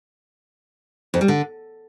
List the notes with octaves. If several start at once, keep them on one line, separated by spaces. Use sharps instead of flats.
F2
G3
D3